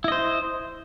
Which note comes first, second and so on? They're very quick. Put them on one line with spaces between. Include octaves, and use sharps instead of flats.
E4 D#5 C5